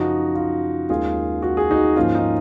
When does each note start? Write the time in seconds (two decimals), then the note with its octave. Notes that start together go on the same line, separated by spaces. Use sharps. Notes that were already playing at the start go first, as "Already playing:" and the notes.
Already playing: F#2 C#3 F3 D#4 F#4
0.35 F4
0.89 D#2 D#3 G#3 C#4 F4 G#4
1.42 F#4
1.57 G#4
1.71 D#4 F#4
1.96 G#2 F3 A#3 C#4 F4
2.15 D#4